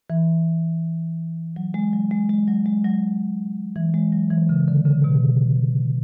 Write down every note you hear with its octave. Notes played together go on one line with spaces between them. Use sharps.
E3
F#3
G#3
F#3
G#3
G#3
F#3
G#3
F#3
E3
G#3
F#3
E3
C#3
D3
C#3
B2